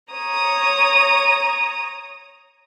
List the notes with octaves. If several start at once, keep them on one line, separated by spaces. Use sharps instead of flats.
C#5 A#5 D#6